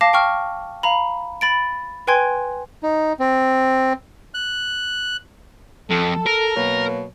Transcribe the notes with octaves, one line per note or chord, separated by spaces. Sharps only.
F5 A5 D6 A#6
G5 C#6 F6
F5 A#5 B5
B5 A6 D7
B4 G5 G#5 C6 G#6
D#4
C4
F#6
F2 A4
A#4
B2 F#3 A#3